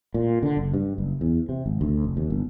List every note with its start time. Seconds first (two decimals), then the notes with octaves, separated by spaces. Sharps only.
0.14 A#2
0.43 D3
0.57 F#1
0.74 G2
0.98 F#1
1.21 E2
1.49 C3
1.66 G#1
1.81 D2
2.05 F1
2.17 D#2
2.30 G1